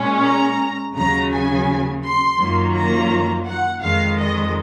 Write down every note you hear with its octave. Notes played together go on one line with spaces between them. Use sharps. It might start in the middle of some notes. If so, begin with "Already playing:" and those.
Already playing: A#2 G#3 C#4
A#5
D#2 C#3 F#3 A#5
G#5
C6
F#2 D#3 F#3 A#3 F4
A#5
F#5
F2 D#3 G#3 F5
D#5